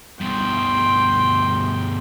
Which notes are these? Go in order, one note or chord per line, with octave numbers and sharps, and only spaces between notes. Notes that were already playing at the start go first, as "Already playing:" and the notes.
G2 B2 G5 C6